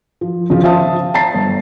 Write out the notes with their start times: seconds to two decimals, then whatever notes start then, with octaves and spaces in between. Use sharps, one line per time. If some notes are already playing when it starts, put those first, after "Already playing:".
0.21 F3
0.50 C#3 F3
0.63 C5 E5 F5 A5 D#6
1.14 A5 A#5 A6 C7
1.34 G1